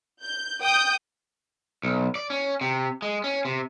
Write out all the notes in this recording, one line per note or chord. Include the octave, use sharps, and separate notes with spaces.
G6
G5 D#6 G6
B1
D5
C#4
C3
G#3
C#4
C3